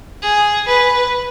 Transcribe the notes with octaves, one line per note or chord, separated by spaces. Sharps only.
G#4
B4